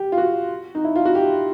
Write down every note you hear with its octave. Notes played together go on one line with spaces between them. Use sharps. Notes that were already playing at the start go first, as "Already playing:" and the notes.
Already playing: G4
F4
F#4
D#4
E4
F4
F#4
G4